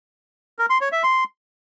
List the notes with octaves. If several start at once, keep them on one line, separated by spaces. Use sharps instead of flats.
A#4
C6
C#5
E5
C6